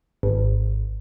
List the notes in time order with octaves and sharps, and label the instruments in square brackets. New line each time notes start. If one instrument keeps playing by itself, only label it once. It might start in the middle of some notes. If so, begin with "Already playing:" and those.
[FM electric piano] G#1